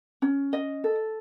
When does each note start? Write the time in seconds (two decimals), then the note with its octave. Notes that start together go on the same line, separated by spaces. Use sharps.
0.22 C#4
0.53 D#5
0.84 A4